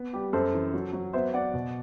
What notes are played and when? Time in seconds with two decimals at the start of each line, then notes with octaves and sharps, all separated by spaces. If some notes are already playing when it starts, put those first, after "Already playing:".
Already playing: B3
0.13 G3 G4
0.33 F#2 A4 C5
0.54 E3
0.74 F#3
0.93 F#3
1.13 B3 C5 E5
1.34 B3 D5 F#5
1.54 B2